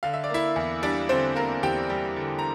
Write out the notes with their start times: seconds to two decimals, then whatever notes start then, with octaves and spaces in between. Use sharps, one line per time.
0.03 D3 F5
0.14 E5
0.24 D5
0.30 A#3 E4 E5
0.56 E2
0.82 G3 D4 D5
1.09 D3 C4 C5
1.36 A#3 A#4
1.63 E2 G4 G5
1.89 G3
2.17 D3
2.39 A#5